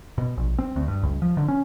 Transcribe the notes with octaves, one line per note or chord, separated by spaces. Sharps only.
B2
A#1
C4
D2
G2
C#2
F3
D3
C#4